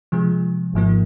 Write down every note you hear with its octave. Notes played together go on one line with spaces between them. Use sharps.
C3 F3 G#3
G#1 G#2 F3 A#3